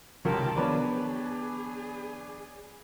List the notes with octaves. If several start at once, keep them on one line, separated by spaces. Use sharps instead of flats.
C#2 C3 D#3 F#3 F4 G4 A#4 A5
D#3 F3 B3 D4 G#4 B4 C#5